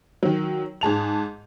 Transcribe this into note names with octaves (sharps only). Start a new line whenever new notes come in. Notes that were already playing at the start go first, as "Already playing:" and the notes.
D#3 F#3
G#2 G#4 A5 F7